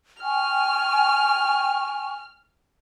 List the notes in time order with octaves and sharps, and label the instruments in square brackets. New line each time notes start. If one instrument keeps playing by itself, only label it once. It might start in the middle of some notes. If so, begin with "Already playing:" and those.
[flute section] G5 G#5 C#6 [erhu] F6